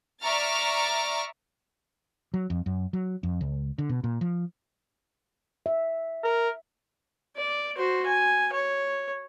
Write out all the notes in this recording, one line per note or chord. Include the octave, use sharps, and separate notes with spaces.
D5 E5 A#5 C#6 F6 A6
F#3
F2
F#2
F#3
F2
C#2
D3
B2
A#2
F3
E5
A#4
D5
F#4 C5
G#5
C#5